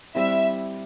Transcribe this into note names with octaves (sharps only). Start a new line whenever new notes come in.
G3 C4 E4 E5